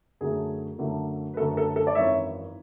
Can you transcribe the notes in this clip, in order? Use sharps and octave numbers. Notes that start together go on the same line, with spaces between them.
F#2 D3 F#3 A3 G#4
F#2 D3 F#3 A3
B4
F#2 D3 F#3 A3 A4
A4
A4
D5
G#1 F#2 E3 C#5 E5